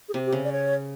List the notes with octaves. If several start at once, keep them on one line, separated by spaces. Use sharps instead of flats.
G#4
C3 G4
G4
C#3
D5
C#5